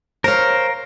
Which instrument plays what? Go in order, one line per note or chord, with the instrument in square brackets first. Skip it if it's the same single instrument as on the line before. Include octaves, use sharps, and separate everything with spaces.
[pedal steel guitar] A#4 F5 [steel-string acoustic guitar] C5 C#5